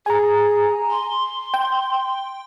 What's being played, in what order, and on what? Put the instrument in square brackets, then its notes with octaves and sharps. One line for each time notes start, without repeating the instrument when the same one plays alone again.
[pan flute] G#4 [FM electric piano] G#5 A#5
[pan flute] C6
[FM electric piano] G5